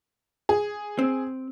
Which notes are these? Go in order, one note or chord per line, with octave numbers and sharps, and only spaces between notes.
G#4
C4